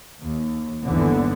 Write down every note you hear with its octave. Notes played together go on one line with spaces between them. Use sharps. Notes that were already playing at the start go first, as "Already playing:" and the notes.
D#2
G1 D#2 D3 E3 B3